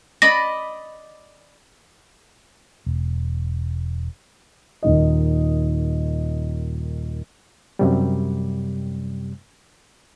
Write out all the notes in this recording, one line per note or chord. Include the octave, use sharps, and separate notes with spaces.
D5 D#5 B5 A#6
E1
D#1 D#3 D#5
F#2 C3 G3